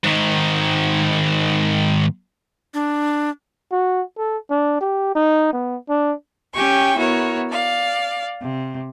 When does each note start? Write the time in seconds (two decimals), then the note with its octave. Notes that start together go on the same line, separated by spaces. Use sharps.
0.04 G#2 D#3
2.74 D4
3.72 F#4
4.18 A4
4.51 D4
4.81 G4
5.15 D#4
5.53 B3
5.89 D4
6.54 C#4 G4 G5 G#5 C#6
6.96 B3 E4 F#4 A#4 C#5
7.50 D5 F5
8.41 C3